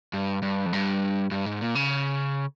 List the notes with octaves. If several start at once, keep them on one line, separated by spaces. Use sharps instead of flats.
G2
G2
F2
G2
G2
G#2
A#2
C#3